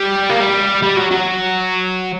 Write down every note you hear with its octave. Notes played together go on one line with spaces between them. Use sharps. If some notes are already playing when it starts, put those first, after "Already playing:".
Already playing: G3
A#3
G3
G3
F#3
F#3